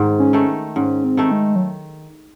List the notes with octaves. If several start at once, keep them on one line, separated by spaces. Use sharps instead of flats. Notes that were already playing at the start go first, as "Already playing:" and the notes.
Already playing: G#2 D#3
C#4
D#3 A3
G#2 C#4
C4
D#3 A3
G#3
F#3